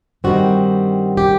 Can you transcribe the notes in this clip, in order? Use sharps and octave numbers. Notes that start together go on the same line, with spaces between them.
G2 D#3 G3 C4 F#4
G4